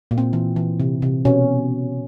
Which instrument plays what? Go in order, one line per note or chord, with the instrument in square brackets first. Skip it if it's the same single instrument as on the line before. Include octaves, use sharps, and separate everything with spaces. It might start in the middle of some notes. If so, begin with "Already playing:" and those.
[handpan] A#2
C4
E3
E3
C3
C3
B2 C#4